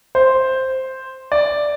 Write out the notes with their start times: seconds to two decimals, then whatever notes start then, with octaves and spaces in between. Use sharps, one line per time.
0.15 C5
1.32 D5